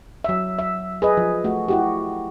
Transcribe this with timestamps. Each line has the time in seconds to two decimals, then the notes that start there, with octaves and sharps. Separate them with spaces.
0.24 F#3 E5
0.59 E5
1.02 G#4 B4 D#5
1.17 F3
1.44 A3 F#4
1.68 E4 F#4 G4